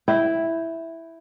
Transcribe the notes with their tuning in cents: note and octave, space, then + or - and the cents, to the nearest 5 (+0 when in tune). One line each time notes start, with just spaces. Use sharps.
E4 +0 G5 -15